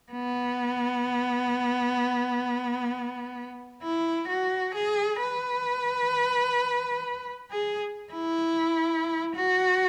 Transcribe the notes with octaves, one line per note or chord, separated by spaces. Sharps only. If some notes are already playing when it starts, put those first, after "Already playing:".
B3
E4
F#4
G#4
B4
G#4
E4
F#4